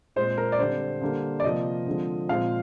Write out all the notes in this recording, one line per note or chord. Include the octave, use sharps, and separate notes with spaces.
A#2 G#3 C4 C5
A#4
D5
D3 G3 C4 C5
D3 G3 A#3
D5
C3 F3 A#3 D#5
D3 F3 G#3 C4
A#2 F3 G#3 C4 F5